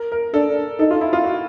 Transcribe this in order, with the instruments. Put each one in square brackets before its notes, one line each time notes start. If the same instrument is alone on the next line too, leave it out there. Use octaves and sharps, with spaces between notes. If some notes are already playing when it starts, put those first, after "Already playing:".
Already playing: [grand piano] A#4
A#4
[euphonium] D4 [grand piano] A4
[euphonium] D#4 [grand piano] A4
[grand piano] F4
E4
F4
F#4